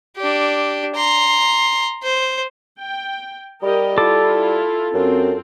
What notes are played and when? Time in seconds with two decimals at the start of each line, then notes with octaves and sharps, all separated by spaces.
0.17 D4 G4
0.95 A#5 C6
2.03 C5
2.80 G5
3.62 G3 G4 A#4 D#5
3.98 E4 F4 A4 D6
4.94 F#2 C4 F4